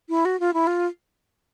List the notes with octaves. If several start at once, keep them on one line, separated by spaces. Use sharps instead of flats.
E4
F#4
F4
E4
F4